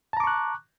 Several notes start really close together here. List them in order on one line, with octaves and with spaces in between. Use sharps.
A5 A#5 D6 C#6 F#6